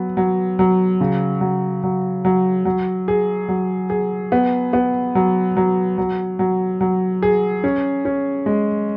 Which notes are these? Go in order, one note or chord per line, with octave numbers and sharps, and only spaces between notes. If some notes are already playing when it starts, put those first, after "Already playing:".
Already playing: F#3 B3
F#3
F#3
C#3
F#3
F#3
F#3
F#3
G#4
F#3
G#4
B3
B3
F#3
F#3
F#3
F#3
F#3
G#4
C#4
C#4
G#3